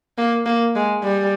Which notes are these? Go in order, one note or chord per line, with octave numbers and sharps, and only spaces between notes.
A#3
A#3
G#3
G3